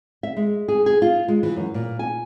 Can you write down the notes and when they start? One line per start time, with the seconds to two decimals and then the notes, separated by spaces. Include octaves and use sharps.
0.23 E5
0.37 G#3
0.68 G#4
0.86 G#4
1.02 F4
1.28 G#3
1.43 E3
1.56 F#2
1.74 A#2
1.99 G#5